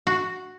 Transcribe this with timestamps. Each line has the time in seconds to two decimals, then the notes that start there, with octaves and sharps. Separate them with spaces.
0.07 F#4